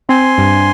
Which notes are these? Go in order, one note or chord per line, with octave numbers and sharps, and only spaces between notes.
C4 G#5 C6
G2